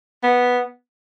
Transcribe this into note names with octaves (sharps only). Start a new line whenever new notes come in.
B3